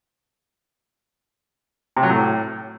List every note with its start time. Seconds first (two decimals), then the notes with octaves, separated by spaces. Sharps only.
1.96 C3
2.03 F#3
2.09 A2